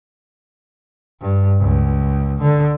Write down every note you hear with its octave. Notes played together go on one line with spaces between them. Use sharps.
G2
C#2
D3